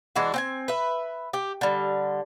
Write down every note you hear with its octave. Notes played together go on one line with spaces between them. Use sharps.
E3 G#3 D4 F#4
C4 G5 G#5
B4 E5
G4
D3 G3